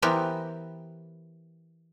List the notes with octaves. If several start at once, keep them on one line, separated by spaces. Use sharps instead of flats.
E3 B3 C4 G4 A#4